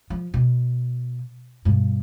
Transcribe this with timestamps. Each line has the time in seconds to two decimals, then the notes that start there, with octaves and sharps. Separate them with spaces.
0.10 F3
0.34 B2
1.65 G2 B2